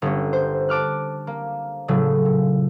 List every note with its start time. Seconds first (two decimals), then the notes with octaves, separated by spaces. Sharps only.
0.02 G1 C#4
0.33 C5
0.69 A5 D6 F6 F#6
1.27 A#3
1.88 A2 C#3 F#3 A3
2.25 A#2